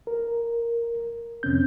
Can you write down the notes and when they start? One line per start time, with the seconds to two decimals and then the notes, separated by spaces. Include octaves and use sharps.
0.07 A#4
1.43 F2 C3 C4 C#4 G6